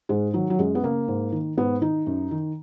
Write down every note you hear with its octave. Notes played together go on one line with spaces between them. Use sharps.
G#2 G#3
D#3 F#3
F#3
F#2 G#3
B3
C#3 A#3
G#2
D#3
G#2 B3
D#3 D#4
F#2
D#3